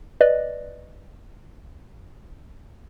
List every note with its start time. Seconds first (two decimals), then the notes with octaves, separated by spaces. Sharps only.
0.21 B4 D5 D#5